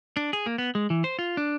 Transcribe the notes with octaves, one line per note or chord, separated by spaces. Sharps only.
D4
G#4
A#3
B3
G#3
E3
C5
F4
D4